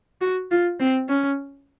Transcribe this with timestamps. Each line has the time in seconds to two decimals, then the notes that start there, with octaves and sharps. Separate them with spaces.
0.21 F#4
0.51 F4
0.79 C4
1.09 C#4